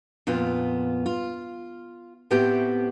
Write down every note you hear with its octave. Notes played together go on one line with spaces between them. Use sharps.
F2 A#2 B3 F4
F4
A2 A3 B3 C4 G4 G5